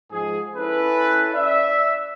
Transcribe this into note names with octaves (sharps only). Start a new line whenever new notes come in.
G#2 F3 G#4
C#4 E4 A4 B4
D5 E5